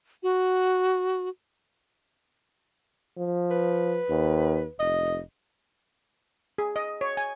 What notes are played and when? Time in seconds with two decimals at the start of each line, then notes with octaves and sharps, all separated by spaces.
0.23 F#4
3.18 F3
3.51 B4
4.09 D#2
4.79 F1 D#5
6.58 G#4
6.76 D#5
7.01 C#5
7.17 G#5